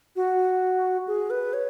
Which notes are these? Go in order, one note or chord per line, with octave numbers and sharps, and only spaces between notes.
F#4
G#4
B4
C#5